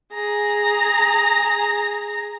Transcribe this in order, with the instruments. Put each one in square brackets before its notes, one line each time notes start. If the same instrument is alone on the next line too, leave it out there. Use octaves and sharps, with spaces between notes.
[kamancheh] G#4 A#5